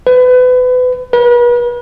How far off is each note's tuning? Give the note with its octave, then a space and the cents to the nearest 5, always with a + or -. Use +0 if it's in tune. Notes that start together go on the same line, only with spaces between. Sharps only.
B4 +30
B4 -40